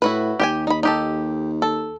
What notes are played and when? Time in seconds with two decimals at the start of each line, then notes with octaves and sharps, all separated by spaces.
0.02 A2 E4 F#4 B4
0.40 D#2 G4 G5 G#5
0.67 D#4 B5
0.83 D#4 G4 A4
1.62 A4